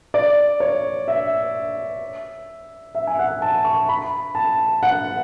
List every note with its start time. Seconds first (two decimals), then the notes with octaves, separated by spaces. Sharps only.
0.14 D5
0.60 C#5
1.08 E5
2.95 E5
3.07 G#5
3.19 F#5
3.42 A5
3.65 C#6
3.89 B5
4.35 A5
4.83 F#5